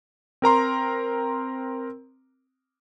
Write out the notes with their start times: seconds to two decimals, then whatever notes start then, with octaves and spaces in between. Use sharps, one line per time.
0.42 C4 A#4 A#5 C6